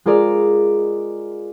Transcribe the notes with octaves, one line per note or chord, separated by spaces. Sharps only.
G#3 F4 G#4 A#4 D5